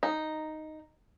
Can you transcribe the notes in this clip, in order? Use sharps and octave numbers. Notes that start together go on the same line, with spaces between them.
D#4